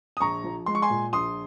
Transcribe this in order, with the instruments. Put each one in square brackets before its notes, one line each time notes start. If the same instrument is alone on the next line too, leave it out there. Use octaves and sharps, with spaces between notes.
[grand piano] D#6
A#1 A#5 C#6
F3
G#3 C6
C#6
G#5 C6
A#2
A#1 C6 D#6